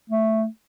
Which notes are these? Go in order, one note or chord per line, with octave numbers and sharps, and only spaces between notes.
A3